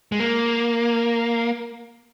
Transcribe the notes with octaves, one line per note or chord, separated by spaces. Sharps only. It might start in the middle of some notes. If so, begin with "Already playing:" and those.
G#3
A#3